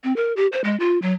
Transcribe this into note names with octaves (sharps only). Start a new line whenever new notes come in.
C4
A#4
G4
C5
G#3
F4
F#3